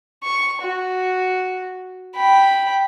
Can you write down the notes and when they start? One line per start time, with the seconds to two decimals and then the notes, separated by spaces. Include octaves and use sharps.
0.24 C#6
0.62 F#4
2.16 G5 B5